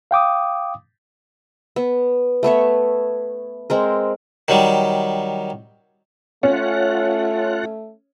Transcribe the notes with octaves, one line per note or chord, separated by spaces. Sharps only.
F5 G5 D6 D#6
B3
A3 B3 C#5 E5
G#3 C4 A#4
D#3 F#3 G3
A3 C#4 F4 F#5